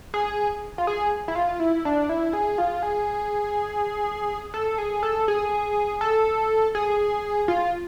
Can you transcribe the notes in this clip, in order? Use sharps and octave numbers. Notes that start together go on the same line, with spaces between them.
G#4
F4
G#4
E4
F4
E4
D4
E4
G#4
F4
G#4
A4
G#4
A4
G#4
A4
G#4
F4